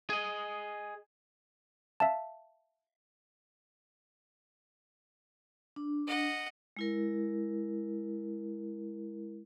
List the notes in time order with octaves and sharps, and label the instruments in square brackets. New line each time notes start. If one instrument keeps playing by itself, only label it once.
[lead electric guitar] G#4 D#5
[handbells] E5 F5 A5
[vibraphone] D4
[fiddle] D#5 F#5
[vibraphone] G#3 E4 A#4